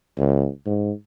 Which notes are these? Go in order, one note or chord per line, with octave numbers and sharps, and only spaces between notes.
C#2
G#2